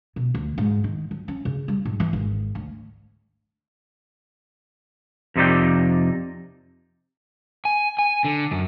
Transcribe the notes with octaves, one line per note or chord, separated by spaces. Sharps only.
B2
D2
G#2
D#3
F#3
C#4
C#3
G3
G#2
E3
G#1
D2
F2 C3 D#4 D5 G5
G#5
G#5
D3
F#2